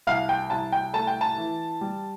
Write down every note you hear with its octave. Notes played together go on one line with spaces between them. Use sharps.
C2 F5
G5
C2 A5
G5
A3 A5
G5
A5
E3
G3